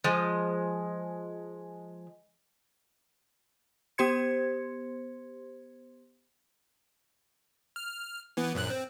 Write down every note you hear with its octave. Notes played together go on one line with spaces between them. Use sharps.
F3 G#3
B3 G4 C5 C6 G#6 C#7
F6
E3 B3
A#1 F#2 F#6
C4